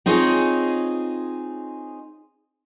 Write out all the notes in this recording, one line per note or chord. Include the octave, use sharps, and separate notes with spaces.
C4 D#4 F4 G#4 C#5